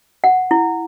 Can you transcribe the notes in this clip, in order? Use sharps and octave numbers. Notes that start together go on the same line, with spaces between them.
F#5
E4